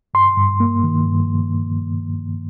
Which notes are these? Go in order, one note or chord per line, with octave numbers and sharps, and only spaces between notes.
G2 C6
G2
A#3
D#3
G2